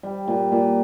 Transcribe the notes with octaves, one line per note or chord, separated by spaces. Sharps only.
G3
A#2
A#2